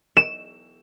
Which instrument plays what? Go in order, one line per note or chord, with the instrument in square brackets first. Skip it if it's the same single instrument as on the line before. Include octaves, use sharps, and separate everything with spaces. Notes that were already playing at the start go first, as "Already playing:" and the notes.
[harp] E7